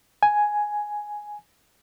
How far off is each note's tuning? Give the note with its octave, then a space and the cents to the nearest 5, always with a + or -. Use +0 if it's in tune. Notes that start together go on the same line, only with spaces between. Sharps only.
G#5 +5